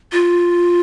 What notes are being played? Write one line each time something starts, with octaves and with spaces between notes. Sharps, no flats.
F4